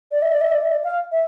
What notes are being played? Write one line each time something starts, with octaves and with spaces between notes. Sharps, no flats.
D5
E5
D5
E5
D5
E5
D5
F5
E5